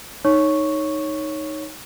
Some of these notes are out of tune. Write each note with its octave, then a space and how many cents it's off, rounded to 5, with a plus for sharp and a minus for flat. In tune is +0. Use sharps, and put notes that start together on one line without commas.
D#4 +0 C#5 +0 C#6 +0